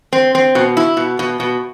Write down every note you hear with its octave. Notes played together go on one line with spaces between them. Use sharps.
C4
C4
B2
E4
B2
B2
B2